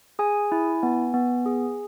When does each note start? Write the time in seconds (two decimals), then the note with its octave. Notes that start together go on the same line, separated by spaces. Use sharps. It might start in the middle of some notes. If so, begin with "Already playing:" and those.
0.19 G#4 G#5
0.52 E4
0.83 B3
1.14 B3
1.46 G#4